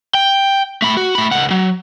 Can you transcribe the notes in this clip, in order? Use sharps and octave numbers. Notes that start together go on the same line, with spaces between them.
G5
A3 B5
F#4
A3 B5
C#2 F#5
F#3